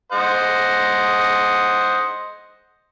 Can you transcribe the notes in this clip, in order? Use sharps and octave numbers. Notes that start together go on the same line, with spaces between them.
C5 D#5 F#5